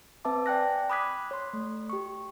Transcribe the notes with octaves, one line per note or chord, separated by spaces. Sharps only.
C4 B4 E5 A5 D6
D5 G5 G#5 F#6 A#6
B5 D6 D#6 F#6 G#6 B6
C#5 C6
A3
G4 C#6